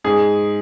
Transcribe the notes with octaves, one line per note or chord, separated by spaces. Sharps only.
G#2 G#4